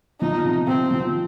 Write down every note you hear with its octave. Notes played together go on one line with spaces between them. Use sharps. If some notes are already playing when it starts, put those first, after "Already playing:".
F3 D#4
C3
C3 C4
F3